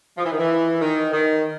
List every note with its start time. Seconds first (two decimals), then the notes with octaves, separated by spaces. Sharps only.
0.17 F3
0.25 E3
0.32 D#3
0.38 E3
0.81 D#3
1.13 D#3